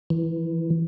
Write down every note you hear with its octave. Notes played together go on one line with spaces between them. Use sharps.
E3